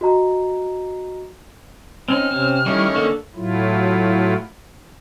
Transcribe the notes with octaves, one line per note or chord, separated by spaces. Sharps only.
F#4 D#5 A#5
C4 C#4 D#4 F6
C3 C4 C#4
D#3 G3 A3 C#4 E4
A#3 D4 A4
A2 F#3 A3 E4 F4